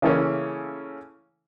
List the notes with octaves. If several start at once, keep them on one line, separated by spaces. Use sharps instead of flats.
C#3 E3 A3 A#3 C#4